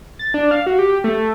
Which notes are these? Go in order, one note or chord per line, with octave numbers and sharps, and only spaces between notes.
A6
D4
F5
F#4
G4
A3